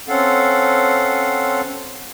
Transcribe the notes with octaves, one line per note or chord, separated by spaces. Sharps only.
C4 C#4 A4 F5 F#5